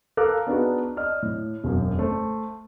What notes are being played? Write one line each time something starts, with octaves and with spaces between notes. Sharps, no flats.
A4 A#4 F5 D6 F#6
B3 D4 D#4 F#4 G#4
D5 D#5 F6
A2
E1 F#2
A3 C5